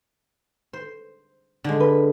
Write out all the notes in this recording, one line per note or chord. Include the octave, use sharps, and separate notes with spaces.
C5
D3 G#3
B4